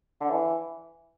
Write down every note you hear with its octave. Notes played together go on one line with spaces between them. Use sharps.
D3
E3